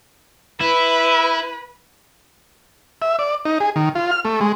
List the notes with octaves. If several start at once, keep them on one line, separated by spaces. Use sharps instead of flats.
E4 B4
E5
D5
D#4
G#4
D#3
F4
F6
A3
G#3